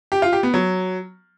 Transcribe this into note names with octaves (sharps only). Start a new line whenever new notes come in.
G4
F4
G4
B3
F#3